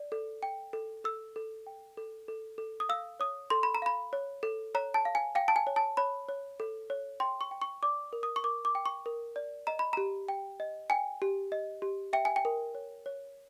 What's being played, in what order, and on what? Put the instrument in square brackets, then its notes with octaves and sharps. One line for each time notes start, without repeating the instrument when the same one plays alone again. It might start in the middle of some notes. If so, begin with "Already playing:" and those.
Already playing: [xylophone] D5
A4
G5
A4
A4 E6
A4
G5
A4
A4
A4
D#6
F5 E6
C#5 D#6
A4 C6
B5
A#5
F5 B5
C#5
A4
C#5 A#5
A5
F5
G#5
F5 G5
A5
G#5
C#5
A5
C#5 B5
C#5
A4
C#5
G5 C6
C#6
G5
C#6
D5 D6
A#4
D#6
C#6
A#4 D6
D6
G5
C#6
A#4
D5
D#5 A#5
B5
G4 A#5
G5
D#5
G5 G#5
G4
D#5
G4
E5 G5
G#5
G5
A#4
C#5
C#5